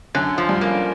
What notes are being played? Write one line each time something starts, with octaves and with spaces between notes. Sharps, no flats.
F#2 D3
F3
G2
A#3